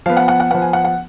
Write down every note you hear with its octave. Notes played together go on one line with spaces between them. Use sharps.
F3 B3 F5
F#5
F#5
F#5
F3 B3 F#5
G#5
F#5
F#5